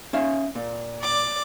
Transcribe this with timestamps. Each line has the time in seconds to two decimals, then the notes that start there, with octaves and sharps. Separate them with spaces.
0.13 C#4 E5 F5
0.55 A#2
1.01 D5 D6